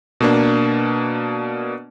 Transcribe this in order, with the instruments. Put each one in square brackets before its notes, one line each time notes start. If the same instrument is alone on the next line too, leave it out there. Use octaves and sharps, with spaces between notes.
[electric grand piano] B2 A#3 D4